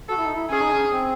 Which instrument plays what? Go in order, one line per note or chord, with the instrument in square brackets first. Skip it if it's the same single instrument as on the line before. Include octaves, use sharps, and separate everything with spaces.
[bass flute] F#4 [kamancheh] A4
[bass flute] E4
D#4
E4
[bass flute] C#4 [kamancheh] G#4
[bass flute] D#4
C#4
C4